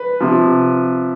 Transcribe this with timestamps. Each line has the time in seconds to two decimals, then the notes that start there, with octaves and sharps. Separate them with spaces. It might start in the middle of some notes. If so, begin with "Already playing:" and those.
Already playing: B4
0.20 C3 F3